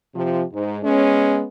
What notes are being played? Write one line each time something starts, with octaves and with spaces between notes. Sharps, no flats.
C3 F3
G#2
G#3 B3 C#4